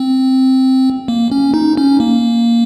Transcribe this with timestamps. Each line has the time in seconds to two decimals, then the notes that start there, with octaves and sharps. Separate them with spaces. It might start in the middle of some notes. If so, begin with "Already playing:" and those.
Already playing: C4
1.08 A#3
1.32 C#4
1.54 D#4
1.77 C#4
2.00 A#3